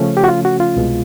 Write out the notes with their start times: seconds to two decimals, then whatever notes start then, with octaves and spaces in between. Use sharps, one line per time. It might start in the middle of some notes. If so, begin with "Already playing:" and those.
Already playing: C#3 F3 A3 C#4
0.17 G4
0.24 F#4
0.28 F4
0.45 F#4
0.60 F4
0.77 C2 B2 G#3